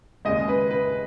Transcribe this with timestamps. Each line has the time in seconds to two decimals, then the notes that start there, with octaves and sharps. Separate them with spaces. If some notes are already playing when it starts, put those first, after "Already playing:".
0.25 D#2 C#3 G#3 D#5
0.48 B4
0.71 B4